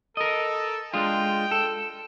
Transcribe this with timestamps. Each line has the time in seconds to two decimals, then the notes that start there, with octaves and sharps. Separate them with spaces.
0.17 A4 A#4 D#5
0.94 G#3 D4 F4 G5
1.51 A4